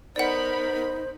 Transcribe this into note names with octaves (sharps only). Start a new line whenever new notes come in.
B3 D#4 A#4 C5 D5 F#5 B5